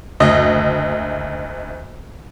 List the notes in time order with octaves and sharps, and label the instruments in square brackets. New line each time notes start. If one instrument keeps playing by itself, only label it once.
[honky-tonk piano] F#1 D2 D#5